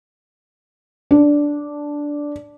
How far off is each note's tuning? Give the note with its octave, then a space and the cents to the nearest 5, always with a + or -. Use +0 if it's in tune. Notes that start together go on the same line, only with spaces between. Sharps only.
D4 -5